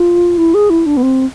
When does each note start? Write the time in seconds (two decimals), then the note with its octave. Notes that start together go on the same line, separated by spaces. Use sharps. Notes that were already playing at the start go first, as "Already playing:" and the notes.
Already playing: F4
0.38 E4
0.54 G#4
0.70 E4
0.86 D4
0.97 B3
1.03 C4